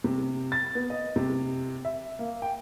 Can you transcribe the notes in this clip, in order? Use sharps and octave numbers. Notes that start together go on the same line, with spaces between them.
C3
A6
B3
D#5
C3
E5
A#3
G5